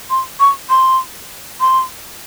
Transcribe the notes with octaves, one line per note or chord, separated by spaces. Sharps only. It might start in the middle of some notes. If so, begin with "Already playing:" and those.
C6
C#6
C6
C6